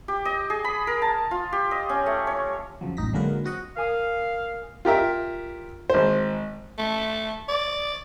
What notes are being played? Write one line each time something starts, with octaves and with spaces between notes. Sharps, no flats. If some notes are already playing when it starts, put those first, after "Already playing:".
G4
D#5
G#4
B5
A#4
A5
F4
G4
D#5
C#4
A3
C#5
F2 C#3 F3 F#3
A1 F#2 D#4 A#6 B6
D3 F#3 G#3 A#3 A#4 B4
C4 F#4 D#5 F#5
A#4 F5 G#5 D#6
F4 G4 A#4 E5
G#1 C5
A3
D5